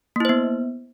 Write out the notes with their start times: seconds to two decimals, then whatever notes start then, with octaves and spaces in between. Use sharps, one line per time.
0.16 A#3
0.20 E4
0.25 C5
0.29 B3